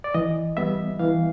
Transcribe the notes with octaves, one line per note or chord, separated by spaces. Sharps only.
D5
E3 D#5
G3 B3 E5
E3 F5